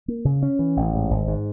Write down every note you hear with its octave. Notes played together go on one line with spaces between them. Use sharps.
A#3
C#3
C#4
E3
A1
G#2
G#1
G#2